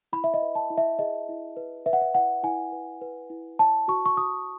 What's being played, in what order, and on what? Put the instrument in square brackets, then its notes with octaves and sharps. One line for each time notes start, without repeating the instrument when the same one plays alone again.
[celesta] E4 B5
E5
D#5
B4
A5
E4
E5
G#4 D#5
E4
B4
B4 E5
F#5
E5
E4 F#5
E4 G#5
B4
B4
E4
C#5 A5
F#4 C#6
C#6
F#4 D#6